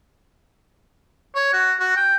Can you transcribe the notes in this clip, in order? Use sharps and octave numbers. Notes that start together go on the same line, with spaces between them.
C#5
F#4
F#4
G5